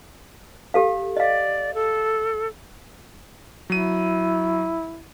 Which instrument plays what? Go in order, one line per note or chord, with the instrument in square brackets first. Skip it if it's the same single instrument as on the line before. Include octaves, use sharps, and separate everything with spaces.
[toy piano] G4 A4 F5
[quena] D5 [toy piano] D#5 F5
[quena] A4
[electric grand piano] F#3 D#7 [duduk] E4